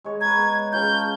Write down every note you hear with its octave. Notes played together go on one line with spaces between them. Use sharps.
G#3 C#5
B4 A#5 G#6
B3
C#3 C#4 F4 G6
A5